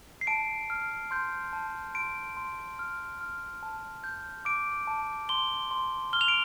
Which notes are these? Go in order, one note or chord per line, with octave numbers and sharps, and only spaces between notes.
C7
A5 D7
F6
C6 G6
A5
C6 D7
C6
F6
F6
A5
G6
D6 D7
A5
C6 G7
C6
F6 G7
F7
D7